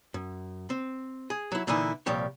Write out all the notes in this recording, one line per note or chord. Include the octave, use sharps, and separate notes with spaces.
F#2
C4
G#4
F#3 E4
A#2 D3 E3 D#4 E4 G#5
C2 A#2 F3 G4 C#5